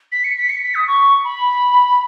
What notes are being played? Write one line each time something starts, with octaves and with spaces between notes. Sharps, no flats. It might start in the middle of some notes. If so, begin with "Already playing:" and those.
B6
C#7
B6
C#7
B6
D#6
C#6
B5